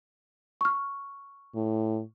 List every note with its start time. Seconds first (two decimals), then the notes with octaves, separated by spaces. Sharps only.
0.61 C#6 F6
1.55 A2